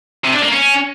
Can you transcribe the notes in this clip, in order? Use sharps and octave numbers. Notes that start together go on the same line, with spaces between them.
C3
D4
A#3
C#4